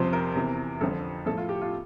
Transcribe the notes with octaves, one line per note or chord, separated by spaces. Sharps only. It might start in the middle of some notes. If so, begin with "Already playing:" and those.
Already playing: F2 C3 F3 C5
A#4
E2 C3 E3
F2 D3 F3 A4
A2 F3 A4
F4
G4
F4